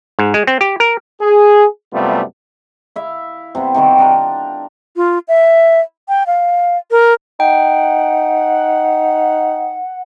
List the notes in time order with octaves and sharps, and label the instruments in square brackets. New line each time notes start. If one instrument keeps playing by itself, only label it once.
[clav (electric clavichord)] G#2
G#3
C4
G4
A#4
[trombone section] G#4
F#2 C3 G3 A3 B3 F4
[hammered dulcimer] E4 E5 F5
C3 G3 B3 C4
C3 D#3 G3 F#4
D4 F4 A#4
[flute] F4
E5
G5
F5
A#4
[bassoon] D#4 [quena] F#5 [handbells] G5